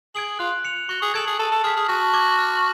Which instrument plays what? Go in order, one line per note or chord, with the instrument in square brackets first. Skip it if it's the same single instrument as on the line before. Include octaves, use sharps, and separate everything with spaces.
[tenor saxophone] G#4 [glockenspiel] G#6 D7 F#7
[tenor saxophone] F4 [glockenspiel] F#6
[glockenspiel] C#7 F7
[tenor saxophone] F#4 [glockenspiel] C#6
[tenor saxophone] G#4
[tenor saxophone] A4 [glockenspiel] G#6 D7 F#7
[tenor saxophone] G#4
[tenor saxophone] A4 [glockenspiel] A5
[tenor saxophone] A4
[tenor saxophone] G#4 [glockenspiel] F6 B6
[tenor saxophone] G#4
[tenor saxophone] F#4 [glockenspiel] A5
[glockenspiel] D6 G#6
F6